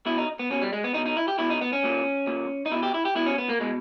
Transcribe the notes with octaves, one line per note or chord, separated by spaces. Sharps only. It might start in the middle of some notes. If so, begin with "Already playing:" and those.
B2 E4
D#4
B3
B2 C#4
G3
G#3
B3
B2 D#4
D#4
E4
G4
B2 E4
D#4
B3
C#4
A#2
A#2
D#4
B2 E4
G4
E4
G4
B2 E4
C#4
B3
A#3
B2 G#3